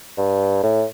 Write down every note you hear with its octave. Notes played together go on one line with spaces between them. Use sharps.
G2
A2